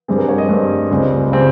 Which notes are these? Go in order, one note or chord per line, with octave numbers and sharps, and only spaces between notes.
G2 G3 C4 G#4
A#4
C#5
D#5
G2 G3 C4
C#2 C#3 G3 C4
C#3 G3 C4